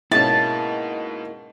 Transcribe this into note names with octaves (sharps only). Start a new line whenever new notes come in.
G#2 B2 A#3 C#4 E4 A5